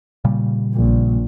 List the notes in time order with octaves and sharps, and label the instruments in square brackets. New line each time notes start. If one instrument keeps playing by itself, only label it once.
[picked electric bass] A#2 C#3 G3
[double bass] A#1